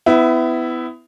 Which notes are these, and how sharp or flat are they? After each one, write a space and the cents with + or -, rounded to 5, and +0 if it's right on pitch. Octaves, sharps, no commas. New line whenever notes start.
B3 +30 E4 +0